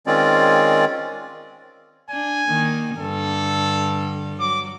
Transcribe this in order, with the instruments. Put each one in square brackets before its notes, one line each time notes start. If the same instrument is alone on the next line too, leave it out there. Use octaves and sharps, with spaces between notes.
[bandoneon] D#3 G#3 C4 C#4 F4 D5
[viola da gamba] D4 [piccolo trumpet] G#5
[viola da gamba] D#3 A#3
[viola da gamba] G2 D3 [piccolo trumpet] A4
[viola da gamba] F#3 [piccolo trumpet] D6